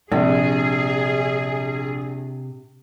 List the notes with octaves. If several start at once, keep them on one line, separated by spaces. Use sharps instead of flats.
A#1 C3 G#4